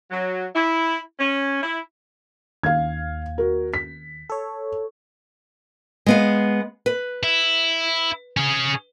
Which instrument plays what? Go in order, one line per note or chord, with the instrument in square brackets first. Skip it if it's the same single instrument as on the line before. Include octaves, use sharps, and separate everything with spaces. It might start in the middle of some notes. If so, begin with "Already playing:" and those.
[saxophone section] F#3
E4
C#4
E4
[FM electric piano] D#2 [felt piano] F5 G#6
[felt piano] F#4 A#4
B6
[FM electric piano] A4 C#5
[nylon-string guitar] G#3 B3 F5
B4
[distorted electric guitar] E4
C#4 G#4